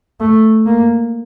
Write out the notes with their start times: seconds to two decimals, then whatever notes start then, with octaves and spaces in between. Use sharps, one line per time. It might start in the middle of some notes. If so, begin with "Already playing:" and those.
0.20 A3
0.66 A#3